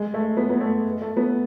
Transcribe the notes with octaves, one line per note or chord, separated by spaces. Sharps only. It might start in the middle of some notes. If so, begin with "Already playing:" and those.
Already playing: G#3
A3
B3
B3
A3
A3
B3